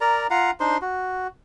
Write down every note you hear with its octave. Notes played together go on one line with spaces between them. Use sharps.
A#4 D5 A#5
F4 F5 F#5 A#5
D4 D#4 C5 C6
F#4